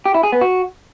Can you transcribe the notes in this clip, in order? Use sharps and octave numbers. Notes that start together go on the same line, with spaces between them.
G4
E4
G#4
B3
F#4